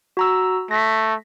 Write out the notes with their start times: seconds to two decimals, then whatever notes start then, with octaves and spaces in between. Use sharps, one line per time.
0.17 F#4 A#5 E6
0.71 A3 A#6 B6